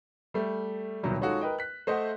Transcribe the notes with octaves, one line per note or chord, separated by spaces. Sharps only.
G3 A3
D#1 C2 B2 D#3 F#3 G3
G#3 C#4 D#4 F4 F#4 A4
A#4 B4 D#5 G5
F#6 B6
A3 C5 D#5 E5 F#5